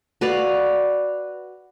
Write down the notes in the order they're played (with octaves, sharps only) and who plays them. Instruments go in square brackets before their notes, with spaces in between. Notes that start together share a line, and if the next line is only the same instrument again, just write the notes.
[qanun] F#4 B4 D5 F5